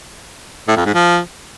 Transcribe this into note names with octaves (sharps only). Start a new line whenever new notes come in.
A2
F2
G#2
F3